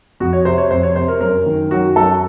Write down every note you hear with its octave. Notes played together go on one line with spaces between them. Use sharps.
F2 F#4
C#5
C3 C5
C#5
F2 C5
C#5
C3 C5
A#4
F#2 A#4
D#3
F#2 F#4
F#2 A4